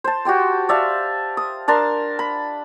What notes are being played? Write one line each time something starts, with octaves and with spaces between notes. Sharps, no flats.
C5 A5
F#4 G4 G5 C6
D5 E5 F5 A5
D#6
D4 A#4 A5 C6
B5